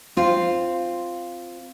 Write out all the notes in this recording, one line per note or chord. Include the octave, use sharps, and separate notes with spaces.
C4 F4